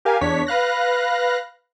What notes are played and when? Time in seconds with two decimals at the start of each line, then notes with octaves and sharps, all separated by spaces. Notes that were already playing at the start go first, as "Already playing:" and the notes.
0.05 G4 A#4 F5 G#5
0.21 E2 D4 C#5 B6
0.47 B4 F5 F#6 A#6